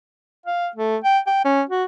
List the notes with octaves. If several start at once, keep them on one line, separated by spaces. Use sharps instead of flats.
F5
A3
G5
G5
C#4
F#4